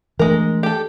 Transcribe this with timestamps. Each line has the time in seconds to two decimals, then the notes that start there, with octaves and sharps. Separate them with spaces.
0.19 E3 G#3 A3 D4 A#4
0.63 G4 A4